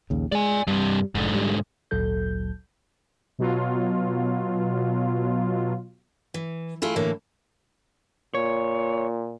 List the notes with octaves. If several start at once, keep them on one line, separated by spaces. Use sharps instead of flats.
A#1 D#2 C#3
G#3 D5 G#5
G2 C3 G3
F1 G#2 D3
G3
G#1 D2 A#2 F#3 A4 G6
B2 F#3 F4
E3
A3 E4 F4 G#4
A2 D3 E3 A#3 E4
A#2 C#5